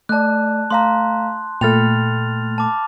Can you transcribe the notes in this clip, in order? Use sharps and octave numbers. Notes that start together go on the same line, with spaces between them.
A3 D5 A5 F#6
A3 F5 A#5 C6
A#2 A3 G5 B5 F6 A6 F7
A5 D6